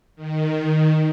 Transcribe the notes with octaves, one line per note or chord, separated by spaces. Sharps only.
D#3